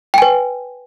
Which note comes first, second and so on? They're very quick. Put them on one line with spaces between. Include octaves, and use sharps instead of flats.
G5 G#5 B4